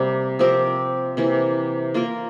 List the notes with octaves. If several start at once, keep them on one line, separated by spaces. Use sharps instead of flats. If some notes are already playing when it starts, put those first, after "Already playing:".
Already playing: C3 G3 A#3
F3 C4 G4 A#4
C3 E3 A#3
A#3 F4 A#4